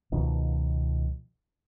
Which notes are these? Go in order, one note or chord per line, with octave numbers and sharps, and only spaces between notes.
C#2 B2 D#3 F3